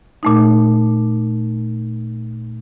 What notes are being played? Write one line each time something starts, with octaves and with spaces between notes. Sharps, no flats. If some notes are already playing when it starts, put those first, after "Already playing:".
A#2 A3 D#4